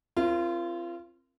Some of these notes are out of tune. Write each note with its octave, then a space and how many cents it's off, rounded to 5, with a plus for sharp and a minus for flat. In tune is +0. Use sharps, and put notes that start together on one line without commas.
C4 +20 F4 -30 A#4 +0